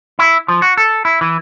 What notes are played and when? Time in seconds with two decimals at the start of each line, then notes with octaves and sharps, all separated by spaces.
0.19 E4
0.48 F3
0.62 F#4
0.77 A4
1.05 E4
1.21 E3